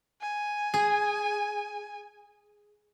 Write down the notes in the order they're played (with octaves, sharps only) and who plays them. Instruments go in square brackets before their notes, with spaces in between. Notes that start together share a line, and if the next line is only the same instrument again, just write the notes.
[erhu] G#5
[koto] G#4